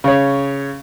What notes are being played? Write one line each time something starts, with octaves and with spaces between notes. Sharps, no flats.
C#3 C#5